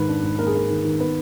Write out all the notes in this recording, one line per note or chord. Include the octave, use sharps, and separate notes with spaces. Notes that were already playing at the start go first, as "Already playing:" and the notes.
Already playing: G#2 D#3 B4
D4
G#2
A#3 A#4
G#4
A#3 A#4
D#3
D#3
B3 B4